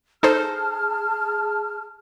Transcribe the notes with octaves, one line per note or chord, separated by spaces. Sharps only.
D#4 G#4 A4 C5 A5 F6